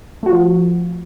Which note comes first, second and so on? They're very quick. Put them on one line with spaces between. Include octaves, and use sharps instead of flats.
A3 F#4 F4 F3